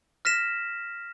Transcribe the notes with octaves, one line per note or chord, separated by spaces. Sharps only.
F6 A#6 B6 E7